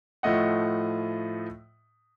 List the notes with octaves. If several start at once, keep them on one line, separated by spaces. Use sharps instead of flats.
A2 F3 A3 D#5 F#5